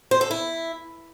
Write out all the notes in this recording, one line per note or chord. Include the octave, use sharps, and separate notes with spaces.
C5
A4
E4